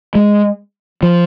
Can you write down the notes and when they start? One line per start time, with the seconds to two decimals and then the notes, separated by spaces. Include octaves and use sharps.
0.15 G#3
1.03 F3